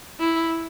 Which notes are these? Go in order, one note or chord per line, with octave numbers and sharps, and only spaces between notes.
E4